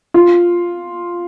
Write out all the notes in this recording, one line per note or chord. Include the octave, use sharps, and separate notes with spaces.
F4